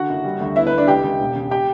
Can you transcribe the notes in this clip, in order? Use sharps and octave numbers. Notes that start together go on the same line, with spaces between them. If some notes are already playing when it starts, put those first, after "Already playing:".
Already playing: D3 F#4 F#5
F#1
G3
D2
B3 E4 E5
B4
B3
D4 D5
C#2 G4 G5
C#2
E1
C#3
G4 G5